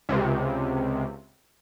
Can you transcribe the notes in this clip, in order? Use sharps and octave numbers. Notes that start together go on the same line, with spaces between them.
C#2 C3